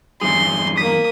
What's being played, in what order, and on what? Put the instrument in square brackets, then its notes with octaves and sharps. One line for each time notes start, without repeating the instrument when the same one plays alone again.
[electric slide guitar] E2 G2 G#4 [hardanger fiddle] C6
[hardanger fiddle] A#3 D#6 [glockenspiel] B6